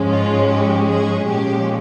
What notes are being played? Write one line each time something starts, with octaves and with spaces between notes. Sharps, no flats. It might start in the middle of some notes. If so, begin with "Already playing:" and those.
Already playing: G#2 F3 G#3 C#4
F4
G4
G#4
A#2 F3 G#3 C#4 G4